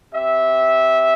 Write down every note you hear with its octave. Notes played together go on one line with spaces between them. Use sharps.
C4 G4 E5